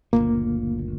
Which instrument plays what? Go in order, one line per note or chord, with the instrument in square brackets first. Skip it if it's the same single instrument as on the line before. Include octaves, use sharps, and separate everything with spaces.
[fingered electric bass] F#1 D2 A#2 [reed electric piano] A#3